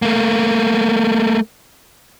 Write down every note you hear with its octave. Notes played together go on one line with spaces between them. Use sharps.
A3 A#3